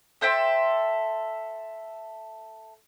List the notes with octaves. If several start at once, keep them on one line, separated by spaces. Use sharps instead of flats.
A4 C5 E5 G5